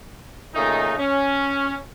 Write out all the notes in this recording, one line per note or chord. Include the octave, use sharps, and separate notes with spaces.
A#2 C#3 A3 D#4
C#4